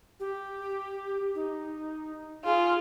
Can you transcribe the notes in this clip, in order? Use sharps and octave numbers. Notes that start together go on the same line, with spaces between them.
G4
D#4
F4 G#4